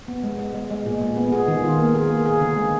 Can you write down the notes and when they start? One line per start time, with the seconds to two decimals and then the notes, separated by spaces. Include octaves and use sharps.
0.08 B3
0.23 G#3
0.39 G#3
0.55 G#3
0.70 G#3
0.86 A#2
1.01 G#3
1.17 B3
1.32 G#4
1.48 D#3
1.64 F4
1.79 A#3
1.95 G#4
2.10 A#3
2.26 G#4
2.41 D3
2.57 G#3